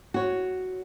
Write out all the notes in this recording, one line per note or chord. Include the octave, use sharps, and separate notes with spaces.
F#4 C#5